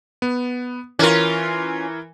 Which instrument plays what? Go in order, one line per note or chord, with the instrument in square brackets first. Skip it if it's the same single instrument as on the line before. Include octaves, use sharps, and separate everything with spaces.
[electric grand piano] B3
[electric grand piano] E3 A#4 [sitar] C#4 F4